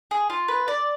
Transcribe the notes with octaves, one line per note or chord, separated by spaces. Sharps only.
G#4
F4
B4
D5